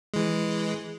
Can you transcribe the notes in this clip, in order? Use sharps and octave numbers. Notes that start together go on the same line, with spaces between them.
E3 G#3